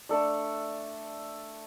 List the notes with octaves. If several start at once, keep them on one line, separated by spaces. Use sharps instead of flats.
A3 D4 A4 D5